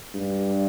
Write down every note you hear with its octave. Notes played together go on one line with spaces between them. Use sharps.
G2